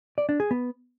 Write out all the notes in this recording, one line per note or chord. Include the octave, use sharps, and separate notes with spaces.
D5
D4
G#4
B3